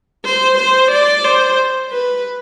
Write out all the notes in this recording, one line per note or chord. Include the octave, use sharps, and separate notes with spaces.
C5
C5
D5
C5
B4